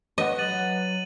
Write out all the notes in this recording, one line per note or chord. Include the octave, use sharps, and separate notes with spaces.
B4 D#5 F#5
F#3 A6 D#7 F#7